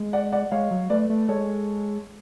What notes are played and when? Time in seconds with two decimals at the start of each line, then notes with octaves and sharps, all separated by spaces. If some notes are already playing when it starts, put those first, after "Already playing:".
Already playing: G#3
0.13 D5 F#5
0.33 D5 F#5
0.51 G#3 C#5 F5
0.71 F#3
0.90 A3 B4 D5
1.10 A3
1.28 G#3 A4 C#5